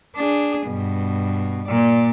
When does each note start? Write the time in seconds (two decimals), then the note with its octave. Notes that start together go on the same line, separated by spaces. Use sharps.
0.16 D4 G#4
0.66 G2 B2
1.69 A#2 D5